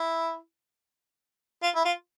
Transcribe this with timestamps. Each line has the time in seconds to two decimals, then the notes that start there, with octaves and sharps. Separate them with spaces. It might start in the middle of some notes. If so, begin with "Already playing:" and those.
Already playing: E4
1.63 F4
1.75 E4
1.85 F4